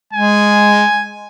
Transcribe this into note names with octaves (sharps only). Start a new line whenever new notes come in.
G#3 G#5